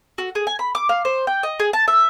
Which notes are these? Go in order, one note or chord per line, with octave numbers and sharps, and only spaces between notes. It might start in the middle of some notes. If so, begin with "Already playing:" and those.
F#4
G#4
G#5
B5
D6
F5
C5
G5
D#5
G#4
A5
E5